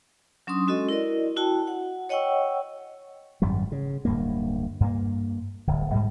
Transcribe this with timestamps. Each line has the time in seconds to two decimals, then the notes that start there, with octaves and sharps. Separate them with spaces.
0.47 F#3 C#4 D4 C6 D#6
0.67 G#3 C#4 F#4 A4 D#5
0.89 E4 A#4 D5 D#5
1.36 E4 F#4 G5 A5
1.67 F#5
2.09 C#5 D#5 F#5 G5 C#6 E6
3.42 G#1 F#2 G3
3.72 C#3
4.05 D1 G2 A#3
4.80 G2 A#3
5.67 D1 G1
5.92 G#2 G3 G#3